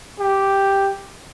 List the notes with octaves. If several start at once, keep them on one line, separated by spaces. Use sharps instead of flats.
G4